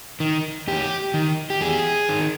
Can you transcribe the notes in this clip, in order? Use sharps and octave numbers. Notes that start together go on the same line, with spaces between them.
D#3
E2 G4
D#3
G4
E2 G#4
D#3